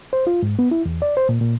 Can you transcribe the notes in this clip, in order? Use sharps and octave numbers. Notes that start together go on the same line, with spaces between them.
C5
F4
G#2
B3
E4
E2
D5
C5
A#2
A#2